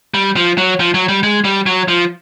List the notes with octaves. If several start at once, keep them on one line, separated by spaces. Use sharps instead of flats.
G3
F3
F#3
F3
F#3
G3
G#3
G3
F#3
F3